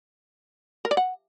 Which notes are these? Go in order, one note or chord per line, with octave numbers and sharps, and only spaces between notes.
A#4
D5
F#5